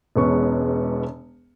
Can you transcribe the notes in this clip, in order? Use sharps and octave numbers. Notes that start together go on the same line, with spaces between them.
E1 E2 G#3 B3 C#4 C#6